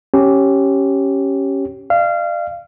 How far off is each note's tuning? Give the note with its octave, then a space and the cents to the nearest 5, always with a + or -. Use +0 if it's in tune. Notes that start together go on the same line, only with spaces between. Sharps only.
C#4 -10 G4 -15
D5 +40 F5 -25